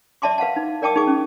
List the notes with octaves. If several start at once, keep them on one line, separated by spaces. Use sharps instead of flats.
D5 E5 A5 C6 D6
B4 F5 F#5 A5
D#4
A#4 D5 G5 A5 D6 D#6
D#4 G#4 D6 D#6
C#4